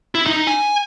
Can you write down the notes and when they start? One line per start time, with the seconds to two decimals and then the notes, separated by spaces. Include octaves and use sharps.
0.15 E4
0.27 D#4
0.47 G#5